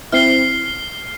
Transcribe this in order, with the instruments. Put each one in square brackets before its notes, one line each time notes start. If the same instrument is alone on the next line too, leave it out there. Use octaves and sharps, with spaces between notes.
[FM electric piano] C4 E4 [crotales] F6 C7 G7